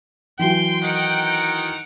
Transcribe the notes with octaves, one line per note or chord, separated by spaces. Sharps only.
E3 F#3 G5 C6
D#3 D#4 F#5 C#7 D7